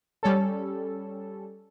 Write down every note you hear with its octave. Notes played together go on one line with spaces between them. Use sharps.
G3 C#4 A4